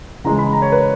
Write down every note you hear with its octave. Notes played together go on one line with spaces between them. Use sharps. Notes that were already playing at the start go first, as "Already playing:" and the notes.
C#3 E3 G#3 A#5
B5
A#5
C#5
B4